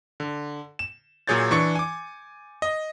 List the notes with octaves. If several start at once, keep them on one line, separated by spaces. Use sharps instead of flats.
D3
E7
A#2 F#3 G#4 C#5 G6 A6
E3 D4 C#6 A6 C#7
G#5 D6
D#5